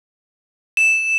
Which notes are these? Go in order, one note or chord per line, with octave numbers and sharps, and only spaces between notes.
E7